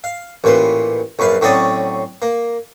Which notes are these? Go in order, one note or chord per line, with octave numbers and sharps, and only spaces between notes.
F5
A1 A#2 B4 C5
A#1 F#2 B4 F5
A2 F#3 C4 C#4 D5 D#6
A#3